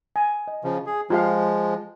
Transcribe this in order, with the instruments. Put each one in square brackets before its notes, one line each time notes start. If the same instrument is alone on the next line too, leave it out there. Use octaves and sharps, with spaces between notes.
[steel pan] G#5
D#5
[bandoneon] C#3 F3
G#4
[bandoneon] F3 G#3 [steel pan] F4 G4 F5